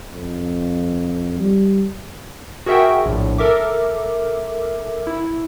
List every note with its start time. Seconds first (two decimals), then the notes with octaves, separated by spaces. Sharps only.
0.13 F2
1.39 G3
2.66 F#4 G#4 A#4 E5 F#5 G5
3.05 A#1 A2
3.38 A4 A#4 E5 D6
5.07 E4